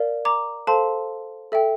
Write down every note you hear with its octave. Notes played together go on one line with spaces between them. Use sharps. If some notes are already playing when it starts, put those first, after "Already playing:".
Already playing: A#4 D5 F5
A#5 D6
A4 C5 F5 A5 C6
A4 E5 G5